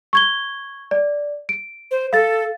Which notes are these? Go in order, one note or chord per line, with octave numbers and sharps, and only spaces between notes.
C#6 G#6 G7
D5
D7
C5
A4 F5 A6